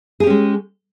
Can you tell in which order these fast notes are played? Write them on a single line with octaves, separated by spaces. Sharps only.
G#4 G4 C#4 G#3